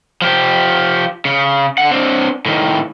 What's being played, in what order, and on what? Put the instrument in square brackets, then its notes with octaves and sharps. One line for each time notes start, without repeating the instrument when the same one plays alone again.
[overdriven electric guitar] F3 G4
C#3
D3 F#5
C4 D4
A2 D#3